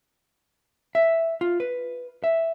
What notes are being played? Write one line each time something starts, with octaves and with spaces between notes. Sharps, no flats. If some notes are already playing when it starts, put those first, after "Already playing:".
E5
F4
B4
E5